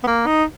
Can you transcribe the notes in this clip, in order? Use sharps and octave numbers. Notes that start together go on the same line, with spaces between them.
B3
A#3
D#4